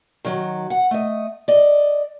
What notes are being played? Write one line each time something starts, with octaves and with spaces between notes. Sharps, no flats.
D#3 F#3
F#5
A3 D#5
D5 D#5